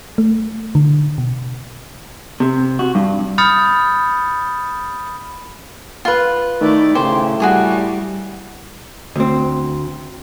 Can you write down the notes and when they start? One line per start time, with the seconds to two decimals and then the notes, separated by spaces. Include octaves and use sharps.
0.18 A3
0.75 D3
1.18 B2
2.40 C3
2.79 F#4
2.95 G2
3.38 B5 D#6 F6 G6 A6 C#7
6.05 F4 B4
6.61 D#3 A3 E4 D5
6.95 A2 C#3 G4 C5
7.40 G3 F#4 G#4 C#5
9.16 D2 C4